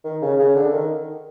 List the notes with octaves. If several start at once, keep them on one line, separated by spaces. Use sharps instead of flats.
D#3
C#3
C#3
D3
D#3